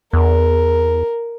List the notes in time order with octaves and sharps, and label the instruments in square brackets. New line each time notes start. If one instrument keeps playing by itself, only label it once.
[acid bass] E2 [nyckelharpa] A#4